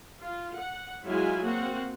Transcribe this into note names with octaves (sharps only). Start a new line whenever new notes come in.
F4
F#5
F#3 G#3 E4 F4 G#4 G#5
A#3 C4 F#4 F#5